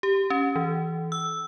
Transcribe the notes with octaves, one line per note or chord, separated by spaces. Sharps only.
G4
C#4
E3
E6